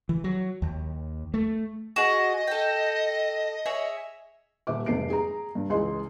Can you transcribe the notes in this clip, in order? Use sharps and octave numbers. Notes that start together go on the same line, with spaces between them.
E3
F#3
D#2
A3
F#4 G#4 D#5
A4 G5
G#4 C#5 E5
D#1 E5 D6
F1 G#2 C3 C7 D7
G#4 A#5
G2
C#2 E3 G#3 D#5 C6